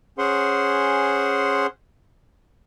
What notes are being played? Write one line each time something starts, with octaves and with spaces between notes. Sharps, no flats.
C#4 G#4 C5 F#5 C6